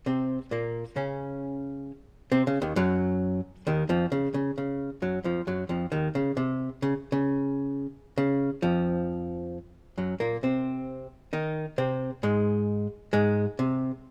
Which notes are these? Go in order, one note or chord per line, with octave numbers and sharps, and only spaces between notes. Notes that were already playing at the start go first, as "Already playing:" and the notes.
C3 C4
A#2 A#3
C#3 C#4
C3 C4
C#3
D#2 D#3
F#2 F#3
D#2 D#3
F2 F3
C#3
C#3
C#3
F#2 F#3
F2 F3
F#2 F#3
F2 F3
D#2 D#3
C#3
C3
C#3
C#3
C#3
F2 F3
F#2 F#3
A#2 A#3
C3 C4
D#3 D#4
C3 C4
G#2 G#3
G#2 G#3
C3